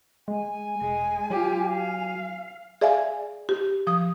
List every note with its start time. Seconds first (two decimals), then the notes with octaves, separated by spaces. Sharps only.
0.28 G#3 G#5
0.82 E1 G#3
1.30 F#3 F4 G4
1.69 F5
2.81 G#4 D5 E5 F5 G#5
3.49 G4
3.87 F3 D#6